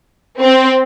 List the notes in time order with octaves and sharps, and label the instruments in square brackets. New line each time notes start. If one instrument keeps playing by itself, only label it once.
[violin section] C4